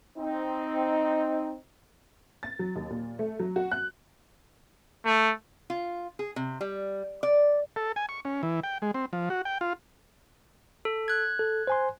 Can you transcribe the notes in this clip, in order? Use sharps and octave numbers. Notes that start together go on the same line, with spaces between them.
C4 D#4
A6
F#3
D#2
A#2
A3
F#3
F#4
F#6
A3
F4
G#4
C3
G3
D5
A4
G#5
C#6
C#4
E3
G5
G#3
C4
F3
F#4
G5
F4
A4
F#6 G#6
A4
C5 G#5 C6